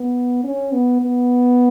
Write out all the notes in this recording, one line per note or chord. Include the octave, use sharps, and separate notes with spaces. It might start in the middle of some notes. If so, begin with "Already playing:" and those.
Already playing: B3
C#4
B3
B3